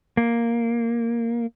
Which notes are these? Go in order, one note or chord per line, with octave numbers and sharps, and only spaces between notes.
A#3